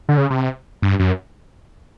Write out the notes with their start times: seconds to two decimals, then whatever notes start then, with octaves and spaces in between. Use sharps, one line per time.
0.09 D3
0.18 C#3
0.31 C3
0.82 G2
1.00 F#2